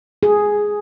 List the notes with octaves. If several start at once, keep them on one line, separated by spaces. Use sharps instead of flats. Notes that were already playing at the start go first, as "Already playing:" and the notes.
G#4